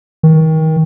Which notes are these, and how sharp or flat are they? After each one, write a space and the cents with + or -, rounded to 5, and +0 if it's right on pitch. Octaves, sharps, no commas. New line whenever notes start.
D#3 +30